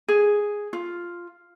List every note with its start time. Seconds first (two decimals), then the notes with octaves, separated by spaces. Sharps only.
0.08 G#4
0.73 F4